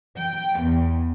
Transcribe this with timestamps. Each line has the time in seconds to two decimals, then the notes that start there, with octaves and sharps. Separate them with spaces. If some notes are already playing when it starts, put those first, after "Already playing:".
0.17 G5
0.60 E2